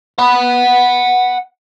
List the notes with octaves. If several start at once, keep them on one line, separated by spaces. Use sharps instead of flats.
F#5 B5